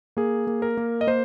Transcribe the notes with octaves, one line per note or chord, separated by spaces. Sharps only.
A#3 G#4
A#3
A#4
A#3
D#5
A#3 C5